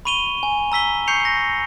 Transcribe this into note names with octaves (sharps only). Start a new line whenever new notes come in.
B5 C#6 D#7 F7 G7
G#5
A#5 E6 B6 G7
C#6 G6 C7 C#7 F7
A#6